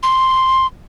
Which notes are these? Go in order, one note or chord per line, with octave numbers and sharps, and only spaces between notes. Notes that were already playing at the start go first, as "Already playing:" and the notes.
C6